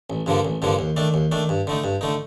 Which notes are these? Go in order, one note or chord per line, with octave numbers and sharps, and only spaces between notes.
A1
G2 D3 F3 A#3
A1
G2 D3 F3 A#3
D#2
D#3 A3 D4
D#2
D#3 A3 D4
G2
D3 A3 D#4
G2
D3 A3 D#4